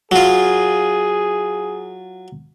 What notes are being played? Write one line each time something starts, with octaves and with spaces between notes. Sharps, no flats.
F#3 F4 G#4